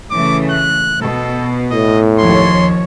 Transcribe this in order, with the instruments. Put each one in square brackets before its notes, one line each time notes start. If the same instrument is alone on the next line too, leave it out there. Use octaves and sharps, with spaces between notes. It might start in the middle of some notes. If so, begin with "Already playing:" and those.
[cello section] C#3 E3 A3 [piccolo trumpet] D6
[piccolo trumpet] F#6
[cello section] B2 [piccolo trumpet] A4
[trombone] A2 [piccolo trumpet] D#5
[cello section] D#2 F3 C#5 [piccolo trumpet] C6